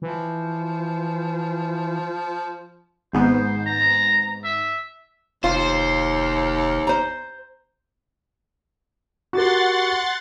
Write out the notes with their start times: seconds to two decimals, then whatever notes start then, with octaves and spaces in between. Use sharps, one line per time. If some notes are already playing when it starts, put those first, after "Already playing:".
0.02 E3 F3
3.13 G#1 G#2 B3 C5
3.66 A#5
4.44 E5
5.44 F1 D#2 F4 C5
6.87 C5 A#5
9.33 F#4 G4 A#4 F#5 C6 A6